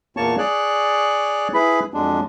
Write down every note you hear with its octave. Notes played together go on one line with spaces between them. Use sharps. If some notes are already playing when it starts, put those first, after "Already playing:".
E2 A#2 A#3 C#5 A5 C#6
G#4 C#5 D5 F#6
E4 G#4 B4 B5
F2 F#3 G#3 D4